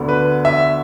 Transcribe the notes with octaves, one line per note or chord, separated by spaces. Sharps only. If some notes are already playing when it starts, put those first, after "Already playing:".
Already playing: D2 D3 B3 D4
B4
E5